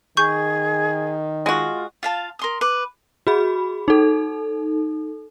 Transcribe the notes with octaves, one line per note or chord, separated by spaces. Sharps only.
D#3 G#4 C#6 G6
G#3 F4 F#4
F4 F5 A5
A#4 C6 D#6
B4 D6
F#4 G#4 B5
D#4 A4